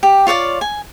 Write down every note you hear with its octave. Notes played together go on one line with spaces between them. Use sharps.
G4
F4 C#5 D5 F5
G#5